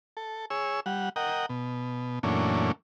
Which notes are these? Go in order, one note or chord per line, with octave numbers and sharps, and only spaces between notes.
A4
G#4 C#5 E6
G3 F#5
A#4 D#5 F#5 G5
B2
F#2 A#2 E3 A3 C#4 D4